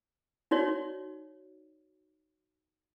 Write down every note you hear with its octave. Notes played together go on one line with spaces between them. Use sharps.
D#4 F#4 C#5 D5